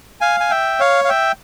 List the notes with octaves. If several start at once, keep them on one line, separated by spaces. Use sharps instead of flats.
F5 G#5
G#5
E5 G5
C#5 F5
F5
E5 G5